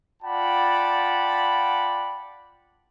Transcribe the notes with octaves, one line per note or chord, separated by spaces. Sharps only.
F4 D5 F#5 G5 A5 B5